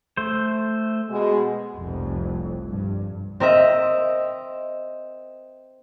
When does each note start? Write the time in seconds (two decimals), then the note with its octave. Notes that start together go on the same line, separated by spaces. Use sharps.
0.17 A3 C5
1.10 B2 G#3
1.74 F1 C2 F2
2.70 G2
3.40 C4 A#4 D#5 E5